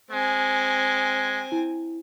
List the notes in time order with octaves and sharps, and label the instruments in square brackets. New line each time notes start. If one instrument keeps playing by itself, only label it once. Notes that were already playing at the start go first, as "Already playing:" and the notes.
[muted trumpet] G#3 [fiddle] C4 G#5
[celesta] E4